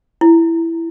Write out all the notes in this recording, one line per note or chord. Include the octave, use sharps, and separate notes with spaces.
E4